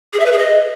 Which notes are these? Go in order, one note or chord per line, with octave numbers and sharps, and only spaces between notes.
G#4
E5
B4
G#4
D#5